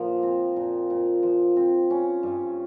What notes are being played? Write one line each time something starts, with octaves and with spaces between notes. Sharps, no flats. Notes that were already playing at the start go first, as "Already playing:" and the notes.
Already playing: A#2 F3
C4
A#2
A#2
F3
C4
C#4
G2